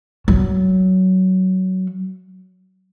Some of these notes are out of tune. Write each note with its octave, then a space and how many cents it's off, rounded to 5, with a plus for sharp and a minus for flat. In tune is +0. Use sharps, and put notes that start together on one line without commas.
F#3 +15